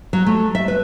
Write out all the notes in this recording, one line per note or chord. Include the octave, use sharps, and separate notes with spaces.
F#3
A3
E5
B4